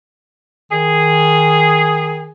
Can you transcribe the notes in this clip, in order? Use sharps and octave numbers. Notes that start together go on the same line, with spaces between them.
D#3 G#4